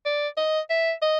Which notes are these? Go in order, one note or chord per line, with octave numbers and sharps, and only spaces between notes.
D5
D#5
E5
D#5